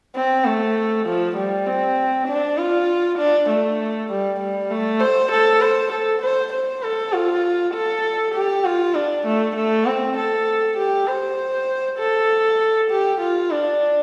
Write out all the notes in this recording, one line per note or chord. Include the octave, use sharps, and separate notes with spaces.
C4
A3
F3
G3
C4
D4
F4
D4
A3
G3
G3
A3
C5
A4
C5
A4
C5
C5
A4
F4
A4
G4
F4
D4
A3
A3
C4
A4
G4
C5
A4
G4
F4
D4